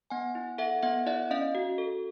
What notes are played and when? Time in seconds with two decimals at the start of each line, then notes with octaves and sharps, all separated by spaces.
0.10 B3 F#5 G#5
0.35 E4
0.58 A4 E5 F#5
0.83 B3 E5 F#5
1.06 E4 D5 E5
1.31 C#4 D#5 F5
1.55 F#4
1.78 A4